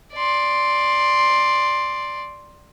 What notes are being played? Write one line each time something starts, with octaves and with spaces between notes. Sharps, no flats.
D5 C6